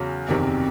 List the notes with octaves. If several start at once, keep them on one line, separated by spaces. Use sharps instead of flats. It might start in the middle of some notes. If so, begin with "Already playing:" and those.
Already playing: E2 C#3 F#3
F#1 E2 C3 D#3 C4